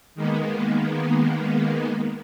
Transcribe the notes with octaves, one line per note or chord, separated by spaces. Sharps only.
D#3 G#3 A#3 B3